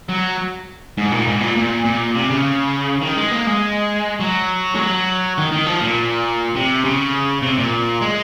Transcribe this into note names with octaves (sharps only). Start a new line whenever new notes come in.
F#3
G#2
A#2
G#2
A#2
A#2
A#2
C3
C#3
D#3
G#3
A#3
G#3
F#3
G#3
F#3
D#3
D#3
F3
A#2
C3
C#3
C3
A#2
G#3